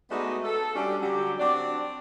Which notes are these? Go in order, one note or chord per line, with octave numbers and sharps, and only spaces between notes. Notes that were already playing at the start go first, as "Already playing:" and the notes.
G#3 A3 B3 D#4 F#4 D5
A4
G3 C#4 D4 F#4 G4
D3 F#3 G3 G4
C4 D4 F#4 D5